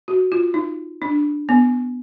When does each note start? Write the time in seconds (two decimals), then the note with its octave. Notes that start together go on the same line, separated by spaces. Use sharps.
0.08 F#4
0.32 F4
0.54 D#4
1.02 D4
1.49 B3